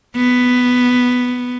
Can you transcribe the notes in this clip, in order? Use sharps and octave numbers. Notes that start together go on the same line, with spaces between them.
B3